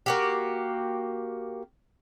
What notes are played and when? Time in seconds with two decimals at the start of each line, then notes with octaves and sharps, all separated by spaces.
0.06 A#3 F#4 G4